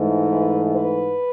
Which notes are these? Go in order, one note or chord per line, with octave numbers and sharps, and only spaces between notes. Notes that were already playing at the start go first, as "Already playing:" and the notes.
Already playing: G#2 E3 A3
B4
B4